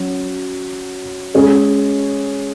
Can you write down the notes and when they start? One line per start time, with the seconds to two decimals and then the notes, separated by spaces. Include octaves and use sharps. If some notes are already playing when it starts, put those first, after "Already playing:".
Already playing: F#3 C#4 F#4
1.35 G#3 C#4 G#4